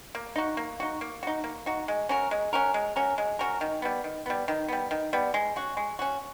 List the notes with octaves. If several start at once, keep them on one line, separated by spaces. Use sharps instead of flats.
A#3
D#4 F#4
A#3
D#4 F#4
A#3
D#4 F#4
A#3
D#4 F#4
G#3
C#4 F#4 A#4
G#3
C#4 F#4 A#4
G#3
C#4 F#4 A#4
G#3
C#4 F#4 A#4
D#3
G3 B3
D#3
G3 B3
D#3
G3 B3
D#3
G3 B3
G#3
C#4 F#4
G#3
C#4 F#4